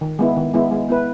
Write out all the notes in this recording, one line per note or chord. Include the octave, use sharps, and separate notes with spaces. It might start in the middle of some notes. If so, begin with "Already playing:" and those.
D#3
G#3 B3 E4
D#3
G#3 B3 E4
G#3
B3 E4 B4